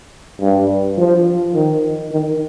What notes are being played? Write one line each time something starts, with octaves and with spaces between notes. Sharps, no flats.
G2
F3
D#3
D#3